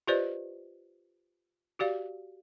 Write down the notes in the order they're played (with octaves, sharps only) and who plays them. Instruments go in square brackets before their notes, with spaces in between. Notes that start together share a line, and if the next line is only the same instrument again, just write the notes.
[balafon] F4 G4 B4 C5 D5 D#5
F#4 G4 D5 F5